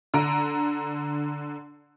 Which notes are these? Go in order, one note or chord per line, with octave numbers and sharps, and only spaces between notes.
D3 A#5 D7